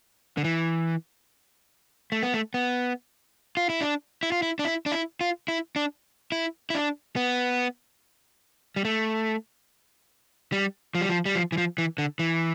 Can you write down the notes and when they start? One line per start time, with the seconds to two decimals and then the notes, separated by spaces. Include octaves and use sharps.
0.37 D3
0.44 E3
2.12 A3
2.23 B3
2.34 A3
2.54 B3
3.57 F4
3.70 E4
3.81 D4
4.23 E4
4.32 F4
4.43 E4
4.59 D4
4.65 E4
4.86 D4
4.92 E4
5.21 F4
5.48 E4
5.76 D4
6.32 E4
6.70 E4
6.75 D4
7.16 B3
8.76 G3
8.85 A3
10.52 G3
10.95 F3
11.01 G3
11.09 F3
11.26 G3
11.35 F3
11.52 E3
11.58 F3
11.78 E3
11.98 D3
12.19 E3